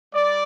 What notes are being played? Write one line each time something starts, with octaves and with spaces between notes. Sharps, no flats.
G3 D5